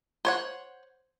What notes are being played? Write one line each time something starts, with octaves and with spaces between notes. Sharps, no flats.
C5 C#5 F#5